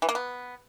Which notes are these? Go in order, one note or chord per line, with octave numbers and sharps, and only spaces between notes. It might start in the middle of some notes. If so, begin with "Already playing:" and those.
E3
A#3
B3